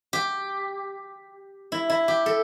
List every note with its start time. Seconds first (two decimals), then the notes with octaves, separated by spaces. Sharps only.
0.13 G4
1.72 E4
1.90 E4
2.08 G4
2.26 A4